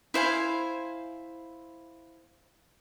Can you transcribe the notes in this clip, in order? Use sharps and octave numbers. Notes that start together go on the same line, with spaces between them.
E4 C5 F5 G#5